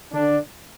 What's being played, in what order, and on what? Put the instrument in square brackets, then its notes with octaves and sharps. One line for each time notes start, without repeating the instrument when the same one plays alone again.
[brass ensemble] D3 D4